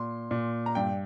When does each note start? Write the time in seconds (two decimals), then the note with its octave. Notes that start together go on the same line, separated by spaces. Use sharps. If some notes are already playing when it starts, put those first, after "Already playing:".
Already playing: A#2 C6
0.31 A#2
0.66 A#5
0.75 G2 G5